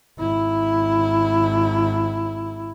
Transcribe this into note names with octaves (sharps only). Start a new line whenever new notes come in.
G#1 E4